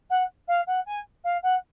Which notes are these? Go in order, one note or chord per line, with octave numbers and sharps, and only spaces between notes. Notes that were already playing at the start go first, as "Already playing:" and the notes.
F#5
F5
F#5
G#5
F5
F#5